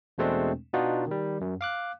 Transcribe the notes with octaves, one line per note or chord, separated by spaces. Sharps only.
E2 B2 G#3 A3 C4 D4
B2 B3 D4 D#4 F4 F#4
D#3 G3
F#2
F5 D6 F#6